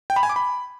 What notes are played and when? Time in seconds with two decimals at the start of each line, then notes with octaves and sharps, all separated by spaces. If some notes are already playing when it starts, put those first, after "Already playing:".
0.10 G5
0.16 B5
0.23 G#5
0.29 D6
0.36 B5